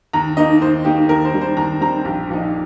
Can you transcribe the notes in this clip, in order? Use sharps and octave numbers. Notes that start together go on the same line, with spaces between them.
D#2 A#5
D#3 A#3 D#4 D#5
D#2 C5
D#3 A#3 D#4 G4
D#2 A#4
C5
D#3 G3 C4
C5
D#2 A#5
D#3 G3 C4 A#5
A#1 G4
A#2 F3 D#4